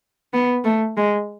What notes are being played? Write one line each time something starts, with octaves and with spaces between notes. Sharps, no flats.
B3
A3
G#3